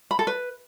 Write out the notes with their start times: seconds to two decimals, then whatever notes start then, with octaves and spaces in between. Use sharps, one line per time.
0.11 B5
0.19 A4
0.27 B4